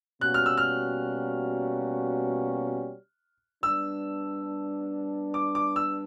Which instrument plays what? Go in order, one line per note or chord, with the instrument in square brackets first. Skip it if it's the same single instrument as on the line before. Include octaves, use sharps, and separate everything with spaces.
[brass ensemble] B2 G3 A#3 C#4 F#4 [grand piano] F#6
[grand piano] F6
E6
F6
[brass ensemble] G3 B3 D4 [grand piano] E6
[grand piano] D6
D6
E6